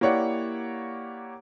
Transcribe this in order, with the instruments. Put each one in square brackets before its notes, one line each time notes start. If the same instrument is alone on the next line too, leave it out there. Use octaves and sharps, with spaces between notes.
[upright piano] A#3 E4 G4 C#5 D5 F#5